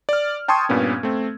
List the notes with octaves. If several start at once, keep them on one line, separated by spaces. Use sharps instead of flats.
D5 F6
G5 A5 C6 C#6 D#6 G#6
G2 A#2 B3 C#4
A3 C4